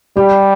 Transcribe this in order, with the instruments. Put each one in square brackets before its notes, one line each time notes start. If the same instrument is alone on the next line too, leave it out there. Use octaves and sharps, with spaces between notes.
[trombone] G3 [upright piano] G4